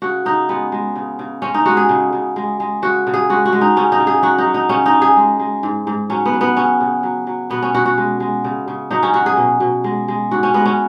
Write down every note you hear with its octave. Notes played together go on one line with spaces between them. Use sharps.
C#3 F#4
C#3 D#4
G#3 B3
G#3
C#3
C#3
G#3 C#4
D#4
G#3 F#4
G#4
C#3
C#3
G#3
G#3
C#3 F#4
C#3
G#4
G#3 F#4
F#4
G#3
D#4
C#3 C#4
D#4
C#3
G#4
F#3 F#4
D#4
F#3
D#4
C#3 C#4
D#4
C#3
G#4
G#3
G#3
G#2
G#2
F#3 C#4
B3
F#3
B3
C#3 C#4
C#3
F#3
F#3
B2 B3
C#4
B2 F#4
F#4
G#3
G#3
C#3
C#3
F#3 D#4
C#4
F#3 F#4
G#4
B2
B2
G#3
G#3
G#2 F#4
C#4
G#3 B3
C#4